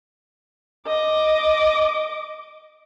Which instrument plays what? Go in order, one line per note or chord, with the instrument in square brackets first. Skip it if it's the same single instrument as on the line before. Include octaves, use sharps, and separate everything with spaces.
[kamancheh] D#5 D6